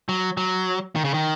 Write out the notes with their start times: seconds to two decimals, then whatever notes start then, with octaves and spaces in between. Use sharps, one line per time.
0.09 F#3
0.37 F#3
0.95 D#3
1.05 C#3
1.14 D#3